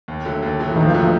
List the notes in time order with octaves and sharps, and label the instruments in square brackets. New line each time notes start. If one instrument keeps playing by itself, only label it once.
[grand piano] D#2
D3 F#3 A3
D#2
D3 F#3 A3
[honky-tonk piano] E3
[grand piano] D#2 [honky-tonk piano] D#3
[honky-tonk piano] F3
[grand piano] D3 F#3 A3
[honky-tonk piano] F3